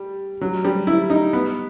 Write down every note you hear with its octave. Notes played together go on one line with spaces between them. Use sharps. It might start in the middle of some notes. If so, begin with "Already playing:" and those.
Already playing: G3
F#3
G3
E4
D#4
B3